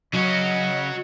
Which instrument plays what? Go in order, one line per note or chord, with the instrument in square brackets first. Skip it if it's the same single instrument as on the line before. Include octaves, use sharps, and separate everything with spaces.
[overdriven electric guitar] C#3 C#4 [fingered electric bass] F#3 [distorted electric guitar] F#4 C#5 [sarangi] D#5